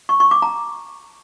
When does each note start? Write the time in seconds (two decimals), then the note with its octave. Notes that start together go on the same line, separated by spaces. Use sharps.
0.09 C#6
0.20 C#6
0.31 D6
0.42 A#5